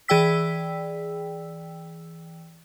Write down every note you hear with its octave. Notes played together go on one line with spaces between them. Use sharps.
E3 G#4 D5 G5 E6 B6